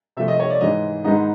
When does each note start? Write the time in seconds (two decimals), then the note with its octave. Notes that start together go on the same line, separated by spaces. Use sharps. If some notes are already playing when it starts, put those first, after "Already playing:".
0.17 C3 F3 A3 E5
0.28 D#5
0.40 C#5
0.50 D5
0.61 G#2 E3 G#3 D#5
1.04 G#2 D#3 G#3 B3 D#4 D#5